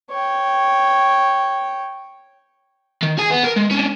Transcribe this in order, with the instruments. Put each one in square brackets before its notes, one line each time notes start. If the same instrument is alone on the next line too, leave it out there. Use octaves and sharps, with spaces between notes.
[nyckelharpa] C#5 G5
[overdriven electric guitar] D#3
G#4 G#5
B3
A#4
G#3
C#4 D4